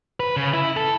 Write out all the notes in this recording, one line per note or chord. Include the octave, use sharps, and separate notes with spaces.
B4
C#3
E4
A4